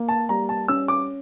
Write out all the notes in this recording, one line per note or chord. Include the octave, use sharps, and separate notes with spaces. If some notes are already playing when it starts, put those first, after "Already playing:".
Already playing: A#3
A5
G3 A#5
A5
C#4 E6
D6